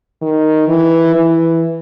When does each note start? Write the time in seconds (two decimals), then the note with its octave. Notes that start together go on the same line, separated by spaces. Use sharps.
0.22 D#3
0.68 E3
1.15 E3